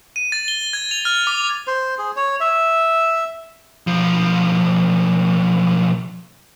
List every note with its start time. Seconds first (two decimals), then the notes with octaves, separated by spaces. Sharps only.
0.16 D#7
0.32 A6
0.48 G7
0.73 G#6
0.91 F7
1.05 F6
1.27 D6
1.67 C5
1.98 G#4
2.16 C#5
2.40 E5
3.87 B1 F3